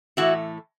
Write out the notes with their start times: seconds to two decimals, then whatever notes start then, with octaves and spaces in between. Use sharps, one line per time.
0.17 A2 E3 A3 E4 F#4